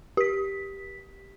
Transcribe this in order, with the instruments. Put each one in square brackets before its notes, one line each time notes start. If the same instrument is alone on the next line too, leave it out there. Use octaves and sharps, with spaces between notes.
[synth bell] G4 B6